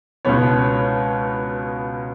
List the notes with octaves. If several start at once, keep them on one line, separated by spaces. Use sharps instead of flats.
C#2 B2 B3 C#5